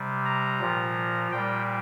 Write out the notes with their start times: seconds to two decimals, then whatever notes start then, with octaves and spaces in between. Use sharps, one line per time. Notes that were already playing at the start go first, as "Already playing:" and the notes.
Already playing: C3 G3
0.25 A#5
0.60 A#2 F3
1.31 A#2 G3 G5